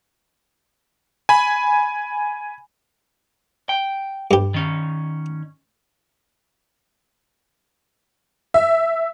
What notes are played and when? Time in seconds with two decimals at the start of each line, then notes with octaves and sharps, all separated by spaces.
1.29 G#5 B5
3.69 G5
4.31 G2 G4
4.54 D#3 C#4
8.54 E5